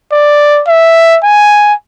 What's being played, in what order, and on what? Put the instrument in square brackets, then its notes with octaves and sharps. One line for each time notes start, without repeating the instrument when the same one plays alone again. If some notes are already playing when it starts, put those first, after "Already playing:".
[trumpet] D5
E5
G#5